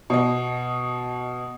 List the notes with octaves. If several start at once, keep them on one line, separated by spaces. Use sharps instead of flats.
B2 D#5